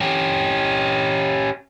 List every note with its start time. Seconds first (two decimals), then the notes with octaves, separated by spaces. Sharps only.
0.01 C#4 G4